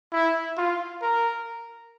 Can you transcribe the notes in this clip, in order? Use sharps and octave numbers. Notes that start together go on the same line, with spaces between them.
E4
F4
A#4